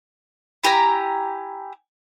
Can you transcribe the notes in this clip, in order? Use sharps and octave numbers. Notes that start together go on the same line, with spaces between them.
E4 G4 G#5 A#5